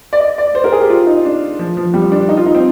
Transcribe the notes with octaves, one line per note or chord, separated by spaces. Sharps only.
D5
D#5
D5
C5
A#4
G#4
G4
F4
D#4
D4
F3
F3
G3
D4
D#4
F4
D#4
C4